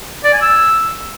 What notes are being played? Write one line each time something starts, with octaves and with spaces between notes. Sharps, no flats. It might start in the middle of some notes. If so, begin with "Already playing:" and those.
D5
G#5
E6